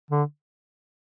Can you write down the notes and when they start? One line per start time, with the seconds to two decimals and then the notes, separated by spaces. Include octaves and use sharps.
0.11 D3